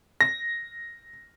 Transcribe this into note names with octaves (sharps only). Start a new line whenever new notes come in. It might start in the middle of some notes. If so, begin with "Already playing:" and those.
A#6